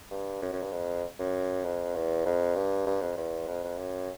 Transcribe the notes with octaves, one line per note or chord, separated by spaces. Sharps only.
G2
F#2
F#2
G2
F2
F#2
F2
E2
F2
G2
G2
F2
E2
F2
F2
F#2